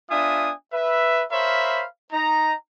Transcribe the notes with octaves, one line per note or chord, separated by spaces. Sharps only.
B3 D4 F4 E5 G#5 D#6
B4 E5
A#4 C5 C#5 E5 F5 B5
D#4 A#5